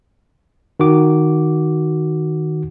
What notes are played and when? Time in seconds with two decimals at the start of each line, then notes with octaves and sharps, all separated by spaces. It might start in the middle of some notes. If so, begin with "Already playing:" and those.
0.80 D#3 F#4 D6